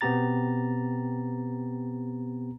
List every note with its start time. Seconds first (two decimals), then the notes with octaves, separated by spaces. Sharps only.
0.01 B2 B3 C4 G4 A#5 A6